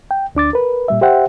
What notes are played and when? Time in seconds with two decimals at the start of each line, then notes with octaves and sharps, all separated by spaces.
0.11 G5
0.35 D2 D4 D6 A6
0.53 A#4 B4
0.88 A#2 G3 E5
1.01 G4 C5 E5 F#5 G5